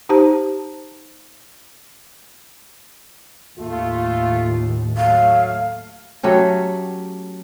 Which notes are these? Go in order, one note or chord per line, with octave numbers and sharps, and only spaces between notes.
D#4 G4 C5 A5
D#2 A2 A3 F4
F#3 A3 F5
F#3 A3 C#4 G4